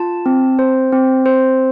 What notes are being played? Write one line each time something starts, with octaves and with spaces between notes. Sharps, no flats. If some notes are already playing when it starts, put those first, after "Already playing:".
Already playing: F4 A5
C4
C5
C4
C5